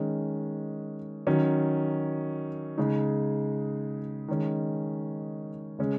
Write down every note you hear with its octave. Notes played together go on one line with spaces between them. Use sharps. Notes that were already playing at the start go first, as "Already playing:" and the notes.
Already playing: D#3 G#3 C#4
D#3 F#3 C#4
C#3 G#3 D#4
D#3 G#3 C#4
C#3 G#3 C#4